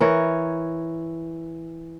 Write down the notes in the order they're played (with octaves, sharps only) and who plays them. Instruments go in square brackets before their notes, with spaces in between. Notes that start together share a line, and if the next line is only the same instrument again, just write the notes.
[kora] E3 A#4 C#5